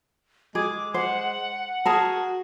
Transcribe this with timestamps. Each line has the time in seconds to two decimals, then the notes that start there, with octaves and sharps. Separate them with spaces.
0.55 G#3 G#4 D6
0.94 C5 F#5
1.86 F#4 G#4 A#4 A5